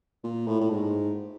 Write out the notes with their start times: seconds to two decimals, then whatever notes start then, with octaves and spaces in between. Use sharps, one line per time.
0.24 A#2
0.47 A2
0.61 A2
0.70 G#2